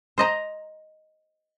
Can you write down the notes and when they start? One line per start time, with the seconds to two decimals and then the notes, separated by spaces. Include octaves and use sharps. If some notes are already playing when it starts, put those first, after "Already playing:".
0.18 C5 D#5 A#5